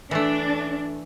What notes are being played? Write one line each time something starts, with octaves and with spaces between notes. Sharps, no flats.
E3 A3 D4